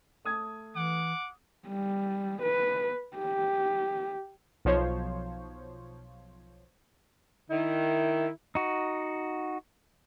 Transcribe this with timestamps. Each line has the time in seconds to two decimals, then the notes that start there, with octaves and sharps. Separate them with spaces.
0.25 A3 D#6 G#6
0.75 E3 F#5 D6
1.68 G3
2.42 B4
3.17 G4
4.65 B1 F3 C5 C#5
7.51 D#3 E4
8.55 D#4 F#4